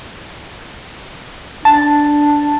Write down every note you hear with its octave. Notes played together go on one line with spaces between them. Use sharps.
D4 A5